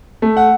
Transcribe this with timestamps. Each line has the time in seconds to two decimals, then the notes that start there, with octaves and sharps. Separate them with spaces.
0.22 A3
0.37 F#5